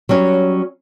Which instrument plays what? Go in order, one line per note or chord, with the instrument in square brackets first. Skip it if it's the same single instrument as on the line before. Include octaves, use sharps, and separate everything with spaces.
[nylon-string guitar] F#3 G3 C#4 C#5